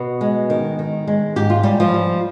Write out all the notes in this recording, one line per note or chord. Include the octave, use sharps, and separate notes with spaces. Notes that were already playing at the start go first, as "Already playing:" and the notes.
Already playing: B2 B3
G#3
D#3
D#3
G#3
G#2 G4
F4
G#2 G3 G4
F3 F4
G3